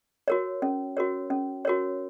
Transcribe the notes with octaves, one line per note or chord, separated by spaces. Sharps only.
F#4 A#4 C#5
C#4
F#4 A#4 C#5
C#4
F#4 A#4 C#5